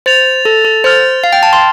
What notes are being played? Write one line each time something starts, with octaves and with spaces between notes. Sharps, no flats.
C5 A6 F7
A4
A4
C5 F6 A6 F7
F5
G5
A5
C6